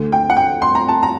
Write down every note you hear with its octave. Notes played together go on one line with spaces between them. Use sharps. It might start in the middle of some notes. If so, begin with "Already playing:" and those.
Already playing: D2 D3
G5
F#5
G5
C6
A#5
A5
A#5